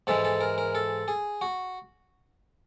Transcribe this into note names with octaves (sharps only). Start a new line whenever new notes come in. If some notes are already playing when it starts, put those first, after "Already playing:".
G#2 E3 G#3 A4
A4
A#4
A#4
A4
G#4
F#4